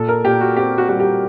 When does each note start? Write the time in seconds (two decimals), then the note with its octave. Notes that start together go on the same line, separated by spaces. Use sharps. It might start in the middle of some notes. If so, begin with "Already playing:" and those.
Already playing: A#2 A4
0.08 A#4
0.24 A#2 G4
0.41 F#4
0.57 C4 G4
0.78 F#4
0.89 G3 F#4
1.00 G4